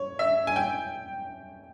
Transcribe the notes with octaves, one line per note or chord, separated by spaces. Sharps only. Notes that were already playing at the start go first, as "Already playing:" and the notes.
Already playing: C#5
E5
G#5
G5